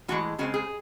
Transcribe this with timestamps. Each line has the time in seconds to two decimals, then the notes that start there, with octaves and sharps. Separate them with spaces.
0.08 A2 E3 G#3 F#4
0.39 C#3 G#3 C4 F#4
0.54 G#4